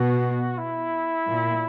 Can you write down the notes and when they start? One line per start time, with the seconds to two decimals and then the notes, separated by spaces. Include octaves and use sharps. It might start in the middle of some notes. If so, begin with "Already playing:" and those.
Already playing: B2 F#4
0.58 E4
1.27 A#2